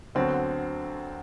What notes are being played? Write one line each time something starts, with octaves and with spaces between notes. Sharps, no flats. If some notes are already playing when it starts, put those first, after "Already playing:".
D2 D3 F#3 B3 C4